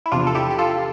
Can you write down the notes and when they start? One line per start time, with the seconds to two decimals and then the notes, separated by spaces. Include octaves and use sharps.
0.06 E4
0.11 E2 C3 F3 D4 F4
0.27 A4
0.35 E4 G4
0.50 G4
0.59 F4 A4